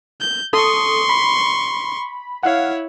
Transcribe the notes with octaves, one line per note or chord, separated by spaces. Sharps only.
G6
A4 C6 C#6 D#6
B5
E4 C#5 F5 F#5